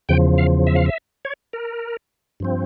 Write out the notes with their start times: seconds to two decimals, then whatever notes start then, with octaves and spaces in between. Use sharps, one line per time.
0.09 E2 C#3 F3 G5
0.38 F5
0.67 E5
0.76 F5
0.86 E5
1.25 C#5
1.53 A#4
2.40 G2 F3 C4